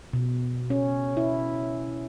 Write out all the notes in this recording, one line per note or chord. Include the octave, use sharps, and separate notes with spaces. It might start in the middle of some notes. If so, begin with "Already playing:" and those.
B2
C#4
E4